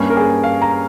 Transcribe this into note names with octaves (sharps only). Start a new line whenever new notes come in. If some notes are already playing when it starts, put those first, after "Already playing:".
Already playing: G2 G3 A#3 C#4
A#4
G#4
F5
A#5